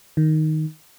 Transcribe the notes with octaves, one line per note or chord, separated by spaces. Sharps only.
D#3